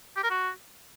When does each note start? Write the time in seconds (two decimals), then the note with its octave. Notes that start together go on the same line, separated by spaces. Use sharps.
0.16 G4
0.23 A#4
0.30 F#4